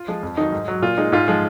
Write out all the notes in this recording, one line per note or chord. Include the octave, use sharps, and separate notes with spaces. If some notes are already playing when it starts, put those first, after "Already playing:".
Already playing: F4
F3 G#3
F2
D#3 F#3 D#4
G#2
F#3
A#2 F4
G#3 D#4
G#2 F4
F3 G#3